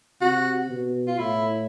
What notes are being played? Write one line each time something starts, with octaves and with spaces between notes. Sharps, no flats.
C3 F#4
B2
F4
A2 E4